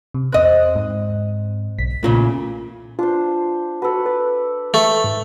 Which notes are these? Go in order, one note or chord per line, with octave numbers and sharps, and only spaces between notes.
C3
E2 C4 D#5 F#6
G#2
B1 B6
E2 A#2 C#3 A3 C#4 F4
D4 F4 C5
F#4 A4 B4
B4 D5
A3 A4 C#5
G#2